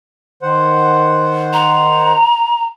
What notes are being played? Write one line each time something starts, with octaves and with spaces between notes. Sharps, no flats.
D#3 C5 F#5
A#5